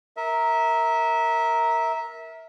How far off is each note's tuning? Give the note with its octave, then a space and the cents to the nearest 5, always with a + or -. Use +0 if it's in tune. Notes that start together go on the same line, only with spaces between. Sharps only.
A#4 +0 E5 -20